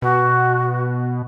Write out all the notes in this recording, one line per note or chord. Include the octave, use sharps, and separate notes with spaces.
B2 F#4